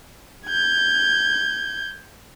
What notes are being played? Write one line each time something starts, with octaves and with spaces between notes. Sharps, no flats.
G6 G#6